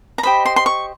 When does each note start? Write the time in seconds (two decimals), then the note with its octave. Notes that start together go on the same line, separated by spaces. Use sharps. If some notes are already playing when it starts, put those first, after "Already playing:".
0.18 A#5
0.23 G4 C5 D#5 B5
0.46 C6
0.56 C6
0.66 C#6